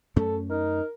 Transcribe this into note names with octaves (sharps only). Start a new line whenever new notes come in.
F#2 A3 C#4 A4
D#4 A#4